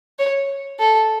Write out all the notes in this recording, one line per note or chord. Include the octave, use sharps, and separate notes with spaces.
C#5
A4